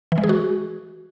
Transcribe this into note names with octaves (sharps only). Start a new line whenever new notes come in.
E3
G#3
G#4
F#4